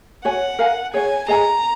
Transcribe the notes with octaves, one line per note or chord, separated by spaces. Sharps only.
F#4 C#5 F#5 G#5
A#4 F5 G#5
G#4 C#5 F#5 G#5
G#4 D#5 G#5 A#5